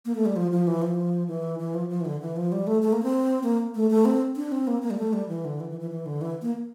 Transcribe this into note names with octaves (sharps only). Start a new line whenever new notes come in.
A#3
A3
G3
F3
F3
E3
F3
E3
E3
F3
F3
E3
D3
E3
F3
G3
A3
A3
A#3
C4
A#3
A3
A3
C4
D4
C4
A#3
A#3
G3
A3
G3
E3
D3
E3
E3
E3
E3
D3
E3
A#3